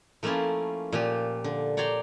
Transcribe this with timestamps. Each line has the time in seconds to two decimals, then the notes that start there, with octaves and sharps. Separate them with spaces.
0.23 F3 A3 A#3 C#4 E4 F4
0.92 A#2 F3 G4
1.44 D3
1.77 C#5 D5 G5 A#5 C6